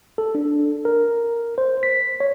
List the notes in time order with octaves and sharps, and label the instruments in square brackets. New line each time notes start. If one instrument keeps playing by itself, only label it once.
[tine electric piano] A4
D4
A#4
C5
B6
C#5